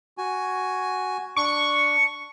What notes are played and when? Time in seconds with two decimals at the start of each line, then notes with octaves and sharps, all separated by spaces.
0.18 F#4 G#5
1.36 D4 C#6